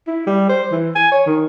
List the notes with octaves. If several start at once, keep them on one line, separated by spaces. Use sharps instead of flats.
E4
G3
C5
E3
G#5
C#5
D#3